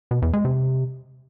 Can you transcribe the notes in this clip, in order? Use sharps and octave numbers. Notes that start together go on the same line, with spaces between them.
B2
E2
G#3
C3